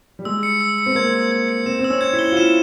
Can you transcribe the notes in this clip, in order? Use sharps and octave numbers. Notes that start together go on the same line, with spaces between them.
G3
G#3 E6
C#7
E6
C#7
C4
A#3 G#6
E6
G#6
C#7
C4 E7
C4
E6
C#4
G#6
E4
G7
F4
E4 E7